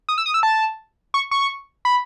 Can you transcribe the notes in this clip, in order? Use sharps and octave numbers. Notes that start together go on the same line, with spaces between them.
D#6
E6
D#6
E6
A5
C#6
C#6
B5